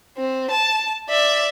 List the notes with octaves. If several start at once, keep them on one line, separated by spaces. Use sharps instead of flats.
C4
A5
D5 E5